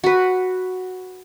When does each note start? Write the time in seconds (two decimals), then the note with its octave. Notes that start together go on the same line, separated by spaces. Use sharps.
0.04 F#4 B4